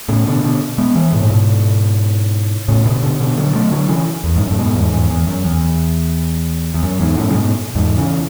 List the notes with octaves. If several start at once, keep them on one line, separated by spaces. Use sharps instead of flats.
A2 C#3
B2 D3
B2 D3
G#3 B3
E3 G#3
G#2 B2
A2
G#2 B2
A2 C#3
B2 D3
B2 D3
B2 D3
D3 F#3
F#3 A3
D3 F#3
C#3 E3
E2
G#2
F#2
A2
G#2 B2
E2 G#2
E2 G#2
E2
F#2
E2
E2
F#2
E2 G#2
F#2 A2
C#3
G#2 B2
E2 G#2
C#3 E3